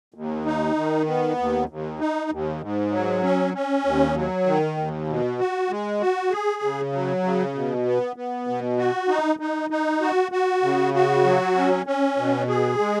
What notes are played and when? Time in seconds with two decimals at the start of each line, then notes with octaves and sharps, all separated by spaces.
0.14 D#2
0.45 D#4
0.76 D#3
1.07 B3
1.38 D#2
1.69 D#2
1.99 D#4
2.30 D#2
2.61 G#2
2.91 F#3
3.23 C#4
3.54 C#4
3.85 D#2
4.15 F#3
4.46 D#3
4.77 D#2
5.08 B2
5.39 F#4
5.69 G#3
6.00 F#4
6.31 G#4
6.62 C#3
6.93 F#3
7.24 C#3
7.54 B2
7.85 B3
8.16 B3
8.47 B2
8.78 F#4
9.09 D#4
9.39 D#4
9.70 D#4
10.01 F#4
10.32 F#4
10.63 C#3
10.94 F#4
11.24 F#3
11.55 C#4
11.86 C#4
12.17 B2
12.48 G#4
12.79 G#3